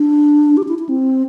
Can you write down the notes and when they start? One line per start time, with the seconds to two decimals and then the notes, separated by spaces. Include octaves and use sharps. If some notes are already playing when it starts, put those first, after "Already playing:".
Already playing: D4
0.57 G4
0.63 D4
0.68 E4
0.79 E4
0.89 C4